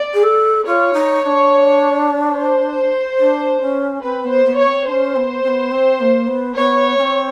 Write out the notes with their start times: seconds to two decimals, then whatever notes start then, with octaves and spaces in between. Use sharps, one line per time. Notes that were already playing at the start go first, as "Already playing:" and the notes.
Already playing: D5
0.13 G#4
0.23 A4
0.65 F4 C#5
0.93 D#4
1.22 D#4
1.25 D4
2.33 C5
3.19 D4
3.61 C#4
4.02 C4 B4
4.24 B3
4.31 C5
4.45 B3
4.59 C#5
4.66 C4
4.87 C#4 D4 C5
5.15 B3
5.43 C4
5.48 B3
5.71 C4
6.00 A#3
6.27 B3
6.56 B3 C#5
6.98 C#4
7.01 C4